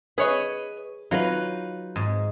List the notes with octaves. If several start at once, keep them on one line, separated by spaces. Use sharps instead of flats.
G#4 B4 C#5 D#5
F#3 D#4 F4 B4
G#2